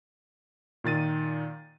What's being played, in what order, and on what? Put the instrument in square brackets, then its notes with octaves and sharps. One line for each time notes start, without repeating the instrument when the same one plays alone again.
[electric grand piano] A#2 D#3 A6 D#7